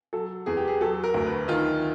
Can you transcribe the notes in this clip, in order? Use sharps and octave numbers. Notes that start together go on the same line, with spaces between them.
F#3 A4
E2 G#4
G4
G#4
F#3 A4
A#4
D2
B4
D#3 F4